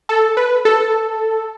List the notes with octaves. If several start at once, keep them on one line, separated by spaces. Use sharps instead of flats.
A4
B4
A4